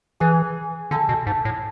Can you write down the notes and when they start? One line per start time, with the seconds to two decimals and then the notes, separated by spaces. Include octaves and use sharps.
0.20 E3 G#4
0.91 D3 A4
1.09 B2
1.27 G#2
1.45 A2